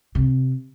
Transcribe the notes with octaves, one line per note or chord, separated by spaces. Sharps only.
C3